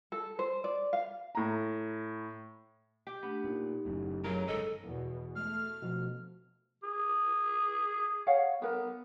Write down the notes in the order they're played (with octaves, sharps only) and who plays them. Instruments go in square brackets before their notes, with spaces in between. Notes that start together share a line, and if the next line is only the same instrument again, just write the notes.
[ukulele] A4
C5
D5
F5
[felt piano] A2 A#5
[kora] G4
[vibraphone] A3 D4 G4 [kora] B3
[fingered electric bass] A#2 [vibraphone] D#4 G4
[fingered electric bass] F#1 F#2 A2
[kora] C#3 A#4 [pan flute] F#3
[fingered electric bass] G1 G#2 [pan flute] A4 [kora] D#5
[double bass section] E2 B2
[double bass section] A3 [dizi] F6
[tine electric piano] B2 F3
[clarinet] G#4
[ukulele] C#5 F5 F#5
[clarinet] B3 [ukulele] A#4 B4